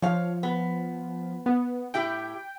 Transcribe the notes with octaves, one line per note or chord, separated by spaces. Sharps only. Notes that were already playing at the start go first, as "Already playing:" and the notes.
F3 C#5 F5
B3
B3
A2 E4 G4 G5